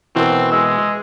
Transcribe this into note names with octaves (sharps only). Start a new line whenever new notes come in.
B2 E3 C4 E4 A#4
G#3 E6